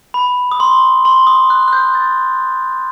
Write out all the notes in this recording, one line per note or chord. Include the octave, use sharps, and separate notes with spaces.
B5
D#6
C6
C6
D#6
F#6
F#6
G6
A6